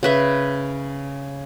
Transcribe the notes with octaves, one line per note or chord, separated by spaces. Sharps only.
C#3 B4 E5